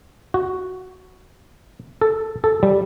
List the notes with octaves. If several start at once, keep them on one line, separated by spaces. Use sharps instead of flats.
F#4
A4
A4
G3